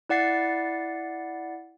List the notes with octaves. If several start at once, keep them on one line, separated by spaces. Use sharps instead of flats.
E4 D5 F#5 A6 C7